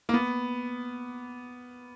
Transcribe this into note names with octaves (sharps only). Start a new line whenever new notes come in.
A#3
B3